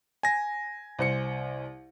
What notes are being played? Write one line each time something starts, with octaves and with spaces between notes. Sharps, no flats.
G#5 A#6
C2 C5 C#7